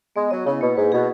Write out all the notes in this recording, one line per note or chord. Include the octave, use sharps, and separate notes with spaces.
G#3 B3
F#3 D#5
C#3 E4
B2 A#3
G#2 B4
B2 G#4